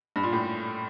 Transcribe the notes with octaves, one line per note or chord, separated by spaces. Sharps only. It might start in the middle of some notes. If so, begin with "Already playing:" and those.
G2
A#2
A2